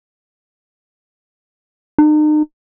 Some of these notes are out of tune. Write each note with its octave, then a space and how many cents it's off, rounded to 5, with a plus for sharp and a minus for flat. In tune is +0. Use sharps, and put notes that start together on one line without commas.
D#4 -40